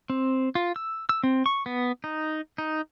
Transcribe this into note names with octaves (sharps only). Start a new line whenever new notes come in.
C4
F4
E6
E6
C4
C#6
B3
D#4
D#4